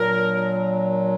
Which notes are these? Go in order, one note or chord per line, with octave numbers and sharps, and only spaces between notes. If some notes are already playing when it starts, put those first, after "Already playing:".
Already playing: A#2 F#3 D4 A#4